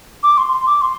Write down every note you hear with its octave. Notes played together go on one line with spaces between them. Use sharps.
D6
C6
C6
D6
C6